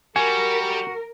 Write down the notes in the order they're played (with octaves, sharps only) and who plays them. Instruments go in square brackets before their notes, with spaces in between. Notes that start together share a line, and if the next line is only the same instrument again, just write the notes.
[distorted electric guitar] G3 [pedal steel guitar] F#4 [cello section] A#4 [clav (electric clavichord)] G#5